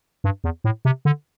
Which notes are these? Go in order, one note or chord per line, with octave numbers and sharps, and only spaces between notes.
G2
E2
A2
C3
D3